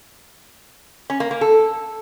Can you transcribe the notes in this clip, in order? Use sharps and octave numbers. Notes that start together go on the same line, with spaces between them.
C#4
A#3
A#3
A4